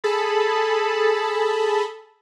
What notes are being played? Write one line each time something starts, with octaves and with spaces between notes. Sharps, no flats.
G#4 A4 A5 B5